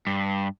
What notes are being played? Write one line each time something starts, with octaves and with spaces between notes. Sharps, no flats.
G2